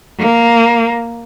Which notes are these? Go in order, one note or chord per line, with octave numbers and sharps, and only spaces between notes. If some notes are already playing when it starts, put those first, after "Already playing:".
A#3